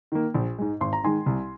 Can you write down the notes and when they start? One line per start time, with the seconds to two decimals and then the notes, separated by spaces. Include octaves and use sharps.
0.12 D#3 A#3
0.35 A#1
0.58 G#2 G#3
0.81 G#1 C6
0.93 A#5
1.03 G#2 D#3 G#3 G#5 C6
1.26 C2